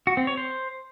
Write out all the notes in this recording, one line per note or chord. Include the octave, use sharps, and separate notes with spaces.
F#4
C4
C#5
C5